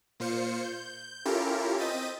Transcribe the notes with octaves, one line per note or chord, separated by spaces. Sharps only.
A#2 F4 C5 C#7
G6
C#4 E4 F4 G4 A4 A#4
C4 D#5 G6 A6 B6 D#7